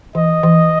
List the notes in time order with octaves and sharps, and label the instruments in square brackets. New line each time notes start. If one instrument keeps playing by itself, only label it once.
[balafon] E3 [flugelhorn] D#5
[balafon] E3